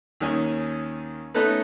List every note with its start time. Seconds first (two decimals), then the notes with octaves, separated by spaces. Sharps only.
0.20 D#2 D#3 C#4 G#5
1.34 A3 B3 C#4 D#4 A4 B4